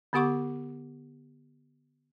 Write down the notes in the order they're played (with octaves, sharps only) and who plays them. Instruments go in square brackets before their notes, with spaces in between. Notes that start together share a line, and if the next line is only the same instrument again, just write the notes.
[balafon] D3 B3 G4 F#5 C#6 D6